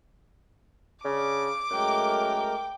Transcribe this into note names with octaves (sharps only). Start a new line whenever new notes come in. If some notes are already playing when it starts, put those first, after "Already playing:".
C#3 D4 D6
F#2 G#3 A3 A#4 G5